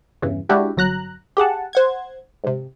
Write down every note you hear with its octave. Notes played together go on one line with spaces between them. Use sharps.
E2 G2 C#3 E3
G#3 D4 E4 F#4 G4
G1 F#3 A#5 F#6
G4 G#4 F#5 A5
C5 F#5 G#6
G#1 C3